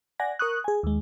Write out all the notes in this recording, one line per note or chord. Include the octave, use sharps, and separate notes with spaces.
D5 F#5 G#5 A#6
A#4 C#6 D#6 F#6
G#4 G#5
D#2 G#3